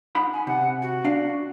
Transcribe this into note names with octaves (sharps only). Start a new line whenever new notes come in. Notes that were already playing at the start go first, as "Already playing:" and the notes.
D#4 F#5 B5
G#5
C3 F#5
F#4
D4 F5